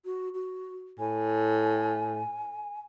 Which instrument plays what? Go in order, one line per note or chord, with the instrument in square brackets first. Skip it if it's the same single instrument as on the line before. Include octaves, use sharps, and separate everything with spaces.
[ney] F#4
F#4
[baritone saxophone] A2 [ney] G#5